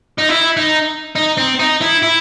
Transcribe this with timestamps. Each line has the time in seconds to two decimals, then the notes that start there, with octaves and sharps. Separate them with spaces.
0.18 D#4
0.29 E4
0.57 D#4
1.15 D#4
1.37 C4
1.59 D#4
1.81 E4
2.03 E4